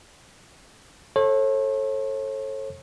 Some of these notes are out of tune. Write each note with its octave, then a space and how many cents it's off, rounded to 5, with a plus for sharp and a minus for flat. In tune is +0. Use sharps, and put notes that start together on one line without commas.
A4 +0 C#5 -40